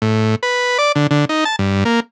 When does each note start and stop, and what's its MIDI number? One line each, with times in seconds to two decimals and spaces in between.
0.02 0.35 45
0.43 0.78 71
0.78 0.92 74
0.96 1.07 50
1.11 1.25 50
1.29 1.44 63
1.45 1.56 81
1.59 1.84 43
1.85 2.00 58